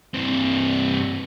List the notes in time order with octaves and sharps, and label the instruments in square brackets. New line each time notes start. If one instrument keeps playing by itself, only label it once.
[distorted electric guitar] G2 C3